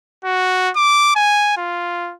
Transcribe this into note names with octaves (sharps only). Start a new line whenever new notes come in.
F#4
D6
G#5
F4